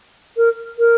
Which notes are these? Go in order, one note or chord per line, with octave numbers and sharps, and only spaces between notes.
A#4
A#4